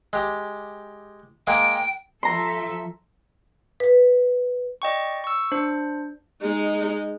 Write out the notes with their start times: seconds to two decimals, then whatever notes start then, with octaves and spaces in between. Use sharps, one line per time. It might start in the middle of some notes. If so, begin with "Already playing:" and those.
0.13 G#3 G4
1.47 G#3 A#3 G5
2.23 F3 A4 E5 A#5 C6
3.80 B4
4.82 D5 D#5 G5 C#6
5.24 C#6 E6
5.52 D4 C5
6.42 G#3 D#4